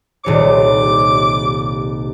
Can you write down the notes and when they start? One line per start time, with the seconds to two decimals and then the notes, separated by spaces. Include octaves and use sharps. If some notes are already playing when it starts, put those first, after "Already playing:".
0.24 D#1 C2 C#5 D6